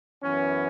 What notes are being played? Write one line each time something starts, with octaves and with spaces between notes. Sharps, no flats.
F#2 E3 B3 C#4